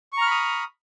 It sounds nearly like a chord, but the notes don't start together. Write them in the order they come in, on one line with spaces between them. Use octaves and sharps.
C#6 A#5 F6 B5 D#6